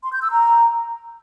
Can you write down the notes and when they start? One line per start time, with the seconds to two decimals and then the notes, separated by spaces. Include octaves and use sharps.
0.03 C6
0.13 G6
0.22 E6
0.31 A#5